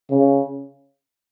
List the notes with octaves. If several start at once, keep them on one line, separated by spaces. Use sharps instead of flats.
C#3